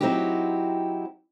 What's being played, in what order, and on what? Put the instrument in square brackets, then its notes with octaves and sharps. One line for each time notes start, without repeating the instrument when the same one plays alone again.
[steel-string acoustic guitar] F#3 C4 D#4 E4 F#4 G4